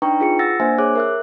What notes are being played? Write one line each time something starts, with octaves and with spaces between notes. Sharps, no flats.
D4 D#4 B4 G5 A#5 C#6
F4 G#4 B4 C#7
F#5 E6 A6 A#6
A#3 D4 C5 E5 G#5
G#4 C#5 D6 F#6
A#4 E5 F#6